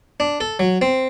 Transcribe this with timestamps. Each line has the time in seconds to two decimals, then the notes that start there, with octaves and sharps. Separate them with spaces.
0.20 D4
0.40 A4
0.59 F#3
0.81 C4